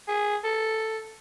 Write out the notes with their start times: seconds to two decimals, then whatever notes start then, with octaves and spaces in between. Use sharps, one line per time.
0.08 G#4
0.44 A4